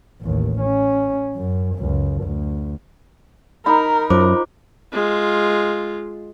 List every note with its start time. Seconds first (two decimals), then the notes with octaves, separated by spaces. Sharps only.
0.21 A1 D#2
0.60 C#4
1.36 F#2
1.75 C#2 F#2
2.22 D2
3.66 D#4 A#4 B5
4.10 F#2 F4 C5 D6
4.92 G#3 F4